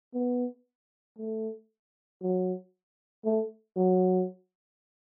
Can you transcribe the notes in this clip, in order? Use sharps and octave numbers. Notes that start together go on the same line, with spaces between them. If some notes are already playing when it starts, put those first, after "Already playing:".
B3
A3
F#3
A3
F#3